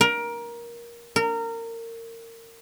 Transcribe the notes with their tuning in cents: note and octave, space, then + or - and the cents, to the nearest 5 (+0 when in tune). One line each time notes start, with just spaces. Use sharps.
A#4 +20
A#4 -25